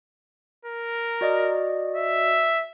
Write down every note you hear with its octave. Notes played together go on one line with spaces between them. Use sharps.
A#4
F#4 D5 D#5
E5